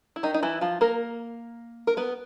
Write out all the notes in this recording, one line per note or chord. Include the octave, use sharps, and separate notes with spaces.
E4
D#3 D#4
D#4
E3 E4
F3 F4
A#3 A#4
A#4
B3 B4